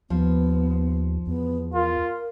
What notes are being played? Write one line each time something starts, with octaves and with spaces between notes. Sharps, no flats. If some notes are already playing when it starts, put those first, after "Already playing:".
D#2 F3 B3
E2 B3
F4 A#4